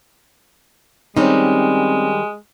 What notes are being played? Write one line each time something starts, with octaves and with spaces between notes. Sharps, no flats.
D#3 G3 G#3 C4 C#4 D#4